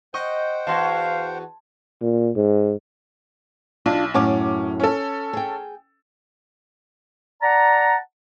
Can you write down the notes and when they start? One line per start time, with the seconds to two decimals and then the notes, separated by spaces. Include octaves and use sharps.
0.14 C5 D#5 F#5 G5 C#6
0.67 E2 F#4 F5 A5 C6 G#6
2.02 A#2
2.36 G#2
3.86 B1 D4 F4
4.14 F#2 A2 C#4 A5 D6
4.80 C#4 A4
5.33 G#4 G5
7.42 D5 F#5 A5 A#5